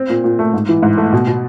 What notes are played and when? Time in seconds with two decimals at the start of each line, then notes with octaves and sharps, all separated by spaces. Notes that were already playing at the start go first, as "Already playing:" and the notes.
Already playing: C4
0.10 A#2
0.24 A#2
0.39 A3
0.54 G#2
0.69 E3
0.83 G#2
0.98 A3
1.13 B2
1.27 B2